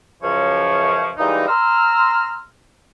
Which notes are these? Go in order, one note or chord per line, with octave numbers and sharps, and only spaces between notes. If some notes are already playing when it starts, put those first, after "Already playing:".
C#2 F#2 F3 C#5
E3 G3 G#3 A#3 D#4
A#5 C6 E6 F6